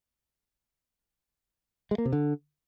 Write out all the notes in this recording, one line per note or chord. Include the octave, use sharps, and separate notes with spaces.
G#3
A#3
C3
D3